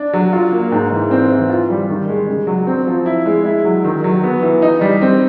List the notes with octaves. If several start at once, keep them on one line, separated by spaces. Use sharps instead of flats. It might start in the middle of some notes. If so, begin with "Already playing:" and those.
Already playing: D4
F#3
F4
A#3
G#2
E3
C4
E3
F4
G3
D#3
G#3
C#3
F#3
C4
F3
E4
G#3
E4
F#3
D#3
F#3
B3
E3
D#4
G3
C4